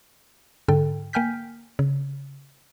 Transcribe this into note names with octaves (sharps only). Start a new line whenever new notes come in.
G#2 D3 A4 G5
A#3 G5 G#5 F6 G6 B6
C#3